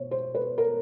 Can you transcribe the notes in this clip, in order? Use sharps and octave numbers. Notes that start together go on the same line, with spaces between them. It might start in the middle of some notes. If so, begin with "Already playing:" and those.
Already playing: B2 C5 C#5
C5
B4
A#4